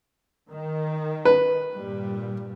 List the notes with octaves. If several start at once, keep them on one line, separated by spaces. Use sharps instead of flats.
D#3
B4
G2 A#2 G3